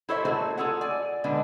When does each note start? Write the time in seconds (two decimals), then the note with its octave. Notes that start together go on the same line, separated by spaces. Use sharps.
0.09 E4 A4 C5 C#5 D#5 E5
0.25 A3 A#3 C4 F#4 G#4 C5
0.58 F4 G#4 A4 C#5 F#5
0.81 D5 G#5
1.24 B2 D3 G#3 B3 D4